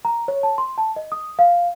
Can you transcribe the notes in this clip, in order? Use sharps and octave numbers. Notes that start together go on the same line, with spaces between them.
A#5
C#5
A5
C6
A5
D#5
D#6
F5